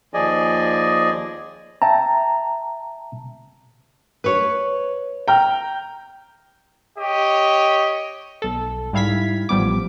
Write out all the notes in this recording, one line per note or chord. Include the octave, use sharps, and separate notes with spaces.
D#2 F3 G#4 D5 D#5 G#5
E5 G5 A5 A#5
B4 C#5
G5 A#5 F6
G4 C#5 D#5
B1 A4
G#2 G3 E4 F5 G#6 B6
A1 F3 G3 B3 D6